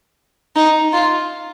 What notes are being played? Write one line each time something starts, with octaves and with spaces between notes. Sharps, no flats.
D#4
F4